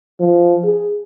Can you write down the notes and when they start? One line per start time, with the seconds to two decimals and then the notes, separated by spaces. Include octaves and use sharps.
0.20 F3
0.64 G#4